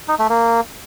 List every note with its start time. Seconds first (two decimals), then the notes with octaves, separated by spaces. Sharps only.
0.08 D#4
0.19 A3
0.30 A#3